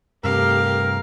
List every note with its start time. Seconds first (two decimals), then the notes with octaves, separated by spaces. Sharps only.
0.24 G2 C3 A3 G4 A#4 F5